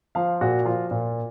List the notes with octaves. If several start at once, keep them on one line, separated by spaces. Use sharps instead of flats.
F3 F5
A#2 F#4
F3 F4
A#2